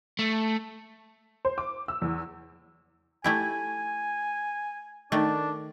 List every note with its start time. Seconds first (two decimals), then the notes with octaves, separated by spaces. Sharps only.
0.19 A3
1.45 C5
1.58 D6
1.88 E6
2.02 E2
3.24 A3 E4 G4 G#5
5.12 D#3 A3 D4